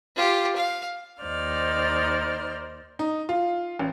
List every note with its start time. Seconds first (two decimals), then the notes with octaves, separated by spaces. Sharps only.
0.16 F4 G4
0.56 F5
1.21 D#2 D#4 C5 D5 F6
2.99 D#4
3.29 F4
3.79 A1